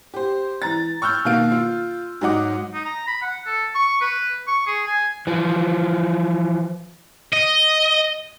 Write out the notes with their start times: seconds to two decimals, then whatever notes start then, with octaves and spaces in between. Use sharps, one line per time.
0.14 G4 C5
0.62 E3 A#5 A6
1.02 C#6 E6 F6 G6
1.25 B2 D#3 A#3 F5 D7
1.52 F4
2.21 G#2 F#3 D#4 D#5 F#5 D6
2.74 D#4
2.85 A#5
3.07 B5
3.22 F#5
3.46 A4
3.75 C#6
4.01 B4
4.48 C#6
4.67 G#4
4.87 G#5
5.27 E3 F3
7.33 D#5